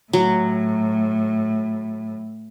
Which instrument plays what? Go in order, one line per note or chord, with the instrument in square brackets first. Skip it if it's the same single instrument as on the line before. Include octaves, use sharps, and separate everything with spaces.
[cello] A2 [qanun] F#3